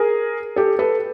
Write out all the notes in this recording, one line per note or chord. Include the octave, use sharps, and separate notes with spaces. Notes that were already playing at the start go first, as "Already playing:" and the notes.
Already playing: G#4 A#4
G4 A4
A4 B4